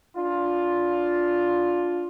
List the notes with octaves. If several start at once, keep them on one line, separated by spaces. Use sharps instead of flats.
D4 F4